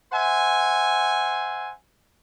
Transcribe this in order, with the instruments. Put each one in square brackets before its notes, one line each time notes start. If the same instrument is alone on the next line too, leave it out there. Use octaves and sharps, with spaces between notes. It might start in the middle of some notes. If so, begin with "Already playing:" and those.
[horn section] C5 E5 F#5 G#5